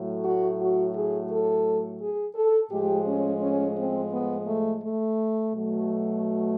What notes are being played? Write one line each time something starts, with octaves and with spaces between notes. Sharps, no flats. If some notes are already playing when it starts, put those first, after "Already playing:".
Already playing: A2 F#3 A3
F#4
F#4
G#4
A4
G#4
A4
A2 F3 G#3 G4
C#4
C#4
C4
B3
A3
A3
B2 F#3 A3